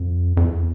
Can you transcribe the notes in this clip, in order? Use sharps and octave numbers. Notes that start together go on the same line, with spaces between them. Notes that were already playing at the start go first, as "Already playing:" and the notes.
Already playing: F2
F2
E2